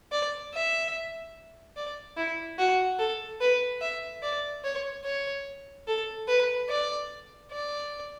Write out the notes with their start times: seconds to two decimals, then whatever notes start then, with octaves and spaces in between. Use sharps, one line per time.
0.12 D5
0.54 E5
1.77 D5
2.17 E4
2.59 F#4
2.99 A4
3.41 B4
3.81 E5
4.23 D5
4.64 C#5
5.05 C#5
5.87 A4
6.28 B4
6.69 D5
7.52 D5